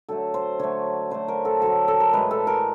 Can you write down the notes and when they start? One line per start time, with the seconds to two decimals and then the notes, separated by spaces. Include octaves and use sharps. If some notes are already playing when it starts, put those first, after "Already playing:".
0.09 D3 F#3 A3 A4
0.34 C5
0.59 D3 F#3 A3 C#5
1.10 D3 F#3 A3 C5
1.28 A#4
1.45 A4
1.62 D3 F#3 A3 A4
1.88 A4
2.00 A#4
2.13 A2 E3 G#3 B4
2.31 A4
2.47 A#4